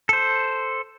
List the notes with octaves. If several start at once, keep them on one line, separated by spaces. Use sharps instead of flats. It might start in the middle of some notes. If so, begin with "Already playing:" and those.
A4 C5